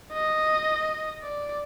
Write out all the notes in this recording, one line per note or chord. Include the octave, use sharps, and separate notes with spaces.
D#5
D5